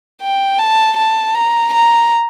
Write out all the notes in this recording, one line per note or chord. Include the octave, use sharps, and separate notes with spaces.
G5
A5
A5
A#5
A#5